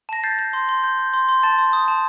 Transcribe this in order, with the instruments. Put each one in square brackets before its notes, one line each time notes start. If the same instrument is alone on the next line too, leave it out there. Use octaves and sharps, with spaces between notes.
[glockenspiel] A5 A#6
G6 A6 C7
G6
C6
C6
G6
G6
C6
C6
A5 A6
C6
D#6
A5